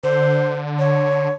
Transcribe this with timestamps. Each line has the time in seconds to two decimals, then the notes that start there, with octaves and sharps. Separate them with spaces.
0.04 D3 C5
0.79 C#5